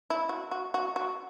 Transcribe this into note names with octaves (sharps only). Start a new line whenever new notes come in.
E4
F#4
F#4
F#4
F#4